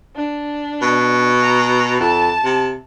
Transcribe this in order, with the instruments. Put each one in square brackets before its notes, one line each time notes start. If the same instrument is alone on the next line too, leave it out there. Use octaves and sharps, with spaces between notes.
[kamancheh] D4
[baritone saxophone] B2
[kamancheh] A#5
[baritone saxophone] F2 [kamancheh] A5
[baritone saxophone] C3